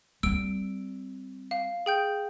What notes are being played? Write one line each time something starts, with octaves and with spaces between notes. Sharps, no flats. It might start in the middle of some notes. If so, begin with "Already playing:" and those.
G3 C4 E6 D7
F5
G#4 G5 G6